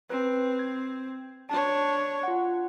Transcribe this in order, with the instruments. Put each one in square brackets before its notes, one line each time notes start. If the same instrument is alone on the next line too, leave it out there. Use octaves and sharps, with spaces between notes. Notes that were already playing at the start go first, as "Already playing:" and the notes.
[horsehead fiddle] C4 [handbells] B4
[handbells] G#6
[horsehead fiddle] D4 C#5 [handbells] A5
[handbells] F4 F#5